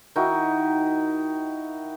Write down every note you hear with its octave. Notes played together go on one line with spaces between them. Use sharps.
D#3 D#4 E4 F#4